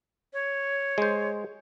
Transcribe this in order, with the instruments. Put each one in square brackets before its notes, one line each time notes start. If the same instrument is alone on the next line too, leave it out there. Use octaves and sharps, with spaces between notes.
[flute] C#5
[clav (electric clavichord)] G#3 C5